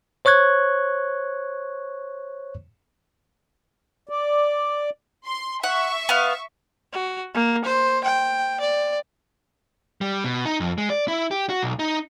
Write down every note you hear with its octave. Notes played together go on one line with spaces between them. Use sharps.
C5 C#5 C#6 F#6 G#6
D5
C6
E5 F#5 C#6
B3 F5
F#4
A#3
C5
G5
D5
G3
B2
D#4
F2
G#3
D5
E4
G4
F#4
B1
D#4